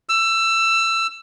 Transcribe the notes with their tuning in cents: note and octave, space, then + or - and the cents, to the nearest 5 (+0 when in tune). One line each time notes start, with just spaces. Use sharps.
E6 +20